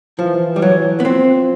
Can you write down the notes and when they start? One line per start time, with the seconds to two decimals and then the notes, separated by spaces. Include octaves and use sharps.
0.19 E3 F3
0.56 G3
0.62 F#3
1.00 B3
1.05 F3 C4